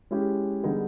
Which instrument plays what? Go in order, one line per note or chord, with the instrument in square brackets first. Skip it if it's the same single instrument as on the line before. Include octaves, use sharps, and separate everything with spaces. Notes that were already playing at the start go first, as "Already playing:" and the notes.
[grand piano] G#3 C#4 E4 G4
D3 G3 B3 D#4 G#4